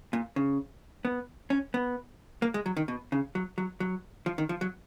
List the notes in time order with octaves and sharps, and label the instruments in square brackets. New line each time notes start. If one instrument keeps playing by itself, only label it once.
[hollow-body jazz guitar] A#2
C#3
B3
C#4
B3
A#3
G#3
F#3
D#3
B2
C#3
F#3
F#3
F#3
F3
D#3
F3
F#3